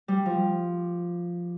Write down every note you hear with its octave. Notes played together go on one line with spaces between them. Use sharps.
G3
F3